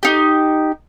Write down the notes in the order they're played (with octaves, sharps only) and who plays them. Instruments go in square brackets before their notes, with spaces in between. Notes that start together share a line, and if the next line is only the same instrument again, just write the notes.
[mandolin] D#4 G4